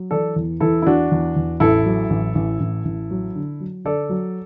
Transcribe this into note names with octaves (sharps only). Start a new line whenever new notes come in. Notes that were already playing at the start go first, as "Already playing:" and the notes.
Already playing: F#3
E3 A4 D5
E2
E3 E4 A4
E4
E2 D4 F#4
E2
E2
A1 E4 A4
F#3
A1
A1
A1
A1
F#3
D3
F#3
D3 A4 D5
F#3